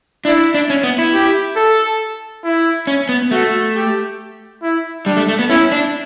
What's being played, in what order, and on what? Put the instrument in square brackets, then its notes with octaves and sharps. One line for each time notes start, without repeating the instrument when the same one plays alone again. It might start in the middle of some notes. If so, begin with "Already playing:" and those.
[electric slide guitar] D4 [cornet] E4
[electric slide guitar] D4
C#4
B3
E4
[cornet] G4
A4
E4
[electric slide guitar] C#4
B3
[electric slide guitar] A3 [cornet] F#4
[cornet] G4
E4
[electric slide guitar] G3 [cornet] D4
[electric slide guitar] A3
A3
B3
[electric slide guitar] C#4 [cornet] E4
[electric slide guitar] D4